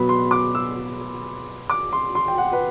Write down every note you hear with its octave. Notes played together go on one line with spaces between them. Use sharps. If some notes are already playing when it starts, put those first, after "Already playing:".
Already playing: B2 F#3 B3 B5
C6
D6
E6
D6
C6
C6
G5
F#5
B4